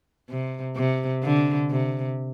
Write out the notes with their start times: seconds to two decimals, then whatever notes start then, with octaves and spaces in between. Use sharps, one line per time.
0.30 C3
0.76 C3
1.23 D3
1.71 C3